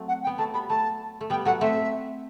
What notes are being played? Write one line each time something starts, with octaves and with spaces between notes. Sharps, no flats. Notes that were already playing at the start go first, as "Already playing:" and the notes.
Already playing: F#3 A3 C4
F#5
G5
B3
F#3 A3 A5
G3 B3 B5
F#3 A3 A5
A3
G3 B3 G5
F#3 A3 F#5
A3 C4 E5